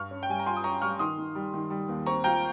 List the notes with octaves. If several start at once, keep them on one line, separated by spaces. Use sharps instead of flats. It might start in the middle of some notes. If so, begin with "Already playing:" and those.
Already playing: G2 C#6 F6
C#4
G5
G3 G#5
A#5
F4 G#5 C6
D#6
C#4 A#5 C#6
G3 C#6 F6
D#3 C6 D#6
D#3
G3
D#3
G3
D#2
C4 A#5 C#6
F4 G5 A#5